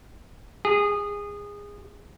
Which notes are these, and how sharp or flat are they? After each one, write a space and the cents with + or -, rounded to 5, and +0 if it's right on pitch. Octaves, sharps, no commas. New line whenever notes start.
G#4 -20